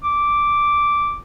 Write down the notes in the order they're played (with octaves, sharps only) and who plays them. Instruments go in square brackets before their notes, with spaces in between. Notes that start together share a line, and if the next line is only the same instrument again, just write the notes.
[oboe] D6